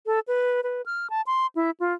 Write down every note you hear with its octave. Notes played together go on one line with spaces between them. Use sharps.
A4
B4
B4
F6
A5
C6
E4
F4